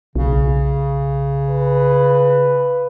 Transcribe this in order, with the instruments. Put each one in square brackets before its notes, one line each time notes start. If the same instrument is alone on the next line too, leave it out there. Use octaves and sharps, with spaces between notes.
[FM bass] B1 [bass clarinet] C#3
[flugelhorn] B4